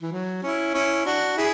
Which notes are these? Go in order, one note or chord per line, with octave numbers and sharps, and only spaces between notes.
E3
F#3
C#4 E4
C#4 E4
D4 F#4
E4 G#4